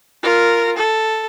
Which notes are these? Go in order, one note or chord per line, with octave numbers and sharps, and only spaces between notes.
F4 A#4
A4